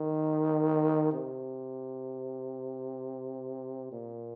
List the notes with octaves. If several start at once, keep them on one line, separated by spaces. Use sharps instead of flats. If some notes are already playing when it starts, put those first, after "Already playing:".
Already playing: D#3
C3
A#2